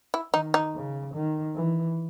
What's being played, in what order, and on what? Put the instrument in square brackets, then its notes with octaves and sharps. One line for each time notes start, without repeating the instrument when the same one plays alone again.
[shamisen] E4
[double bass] D#3 [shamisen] D#4
[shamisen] D#4
[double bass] C#3
D#3
E3